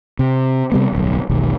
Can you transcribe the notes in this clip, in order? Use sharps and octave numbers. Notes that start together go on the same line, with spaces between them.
C3
C3 G3 B3
D1 B1
E1 B1 D#3